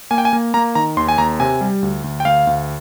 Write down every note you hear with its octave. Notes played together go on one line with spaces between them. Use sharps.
A#3 G#5
G5
G#5
A#3
A#3 A#5
D#3 A#5
D#2 C6
G#5
D#2 A#5
C3 G#5
G3
D2
D2
G5
D2 F5
D2